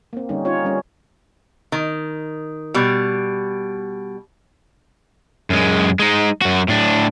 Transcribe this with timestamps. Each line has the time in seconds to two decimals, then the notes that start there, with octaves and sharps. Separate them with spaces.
0.13 A#3 C4
0.29 D3 G3 C#4 D#4
0.45 C#4 D#4 F4 C#5
0.65 G3 C#4
1.72 D#3
2.74 B2 G3
5.50 F#2 G#3
5.99 G#3 D#4
6.42 F#2 F#4
6.68 A2 D4